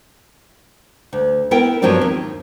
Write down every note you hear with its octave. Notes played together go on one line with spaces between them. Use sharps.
D2
B3 E4 A#4 G5
G2 F3 F#3 A#3 C4 D4
D#2